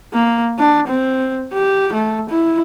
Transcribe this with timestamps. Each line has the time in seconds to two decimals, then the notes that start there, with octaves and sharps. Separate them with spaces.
0.13 A#3
0.59 D4
0.88 C4
1.53 G4
1.94 A3
2.30 E4